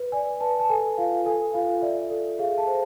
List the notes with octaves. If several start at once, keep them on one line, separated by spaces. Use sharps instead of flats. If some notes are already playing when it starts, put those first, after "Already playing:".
Already playing: B4
D5 G#5
B4 A5
A5
A4 G#5
F4 F5
A4 G#5
F4 F5
D5 E5
A4
G#4 F5
A5
C5